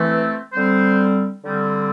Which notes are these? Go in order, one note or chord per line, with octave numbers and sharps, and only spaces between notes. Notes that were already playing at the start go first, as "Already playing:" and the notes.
Already playing: E3 A3 C4
D3 G3 C4 C5
D3 G3 C4